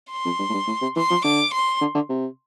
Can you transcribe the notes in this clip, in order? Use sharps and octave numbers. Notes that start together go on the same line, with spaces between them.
C6
F2
G2
A2
G2
A2
C3
E3 C6
F3
D3 D6
C6
D3
D3
C3